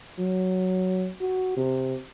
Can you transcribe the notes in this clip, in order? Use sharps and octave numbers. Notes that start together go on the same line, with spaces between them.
F#3
F#4
C3